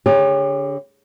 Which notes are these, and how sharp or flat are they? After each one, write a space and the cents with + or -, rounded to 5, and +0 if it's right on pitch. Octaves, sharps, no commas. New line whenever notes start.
D3 -30 G4 +40 C#5 +0